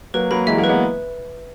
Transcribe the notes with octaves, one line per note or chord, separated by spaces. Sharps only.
F#3 A#3 B4
F#3 A#3 B5
E3 G#3 E5
F#3 A#3
B4
G#3 B3